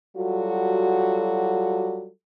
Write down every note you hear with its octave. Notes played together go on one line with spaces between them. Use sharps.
F#3 G3 F4 F#4 A4